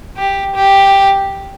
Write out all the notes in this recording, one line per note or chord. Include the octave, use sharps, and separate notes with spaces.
G4
G4